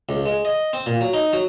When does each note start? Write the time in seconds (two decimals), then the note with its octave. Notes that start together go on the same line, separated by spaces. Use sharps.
0.09 C#2
0.26 G#3
0.45 D#5
0.73 C4
0.86 A#2
1.01 F#3
1.14 D#4
1.33 F#3